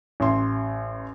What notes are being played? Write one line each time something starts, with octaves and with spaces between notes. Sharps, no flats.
A1 C6